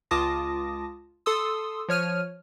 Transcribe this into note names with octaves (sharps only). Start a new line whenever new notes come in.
C#2 F4 A5 D6 D#6 A#6
A4 C6 D#6 E6
F3 C#5 F6 D#7